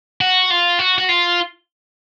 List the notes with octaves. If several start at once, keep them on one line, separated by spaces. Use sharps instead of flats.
F#4
F4
F#4
F#4
F4